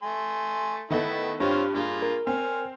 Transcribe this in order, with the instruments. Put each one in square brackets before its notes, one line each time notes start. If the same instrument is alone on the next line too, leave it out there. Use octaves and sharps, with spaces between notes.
[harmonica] A3 G#5 C6
[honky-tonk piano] D#3 B3 A4 [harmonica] A3 E4
[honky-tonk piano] G2 [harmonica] C4 F4 C#5 [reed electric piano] D4 G4
[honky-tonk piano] G2 [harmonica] A#3 F4 G#4
[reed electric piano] A#4
[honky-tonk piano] C4 [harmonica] G#5 F6